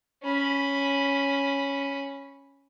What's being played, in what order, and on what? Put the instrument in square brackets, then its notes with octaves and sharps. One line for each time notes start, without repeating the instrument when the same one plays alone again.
[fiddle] C#4 B5